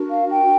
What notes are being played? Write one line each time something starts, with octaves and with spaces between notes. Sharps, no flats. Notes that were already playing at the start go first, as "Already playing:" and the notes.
Already playing: D4 F#4 A#4
F5
G5